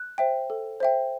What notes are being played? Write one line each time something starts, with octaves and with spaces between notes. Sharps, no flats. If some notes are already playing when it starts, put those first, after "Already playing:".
Already playing: F#6
C5 E5 G5
A4
C5 E5 G5